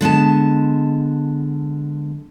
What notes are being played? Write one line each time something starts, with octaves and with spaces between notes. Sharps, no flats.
D3 G#3 B3 A5